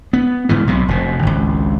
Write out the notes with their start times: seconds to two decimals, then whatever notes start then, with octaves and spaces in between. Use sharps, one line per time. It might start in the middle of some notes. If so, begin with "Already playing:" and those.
0.13 B3
0.49 G#2 C#3 E3
0.67 B1 C3
0.88 F1 B2
1.23 G#1 C#2